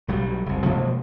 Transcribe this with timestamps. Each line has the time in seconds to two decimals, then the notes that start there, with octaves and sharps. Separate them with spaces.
0.08 B1 F#3 G3
0.46 F#1 C2
0.65 B2 F3 G#3 A#3